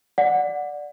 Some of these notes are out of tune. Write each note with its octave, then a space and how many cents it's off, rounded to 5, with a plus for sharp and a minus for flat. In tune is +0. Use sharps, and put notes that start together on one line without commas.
D5 +0 F#5 -15